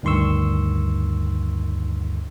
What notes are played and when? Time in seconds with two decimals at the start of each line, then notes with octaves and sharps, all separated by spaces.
0.03 D2 G2 D#3 C6 C#6 E6